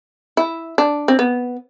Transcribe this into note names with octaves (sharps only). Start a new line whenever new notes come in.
E4
D4
C4
B3